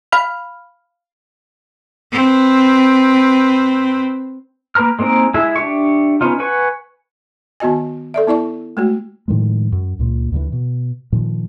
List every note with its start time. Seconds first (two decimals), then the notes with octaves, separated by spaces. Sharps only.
0.12 F5 B5 F6
2.12 C4 B4
4.75 A#3 A#4 B4 A#5 F6
4.99 G#3 A#3 C4 D#4 A#4
5.34 G#3 E4 G#4 E5
5.56 D4 G4 E5 C#6
6.21 B3 C#4 D#4 F4
6.40 B4 F#5 G#5 C#6
7.60 D#3 B3 F#4 D#5 G#5
8.14 A4 D5 E5
8.27 B3 E4 D5 C#6
8.77 G#3 A3 F#4
9.28 A2 D#3 F3 G#3
9.72 F#2
9.99 C#2 A#2
10.32 D2 D3 E3
10.52 B2
11.12 A#2 D#3 F3